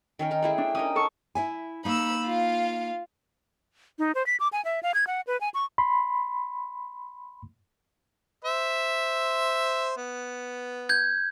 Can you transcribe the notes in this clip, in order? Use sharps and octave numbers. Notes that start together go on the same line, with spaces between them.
D#3 C#4 A#4 G5
D#4 A#4
A3 E4 G#4
D4
C#4 D#4 A#4 D#6
A4 A5 C#6
E4 E5 G#5
A#3 D#4 B5 E6
F4 F5
D#4
C5
B6
D6
G#5
E5
F5
G#6
F#5
B4
G#5
C#6
B5 C6
C5 E5
B3
G6 G#6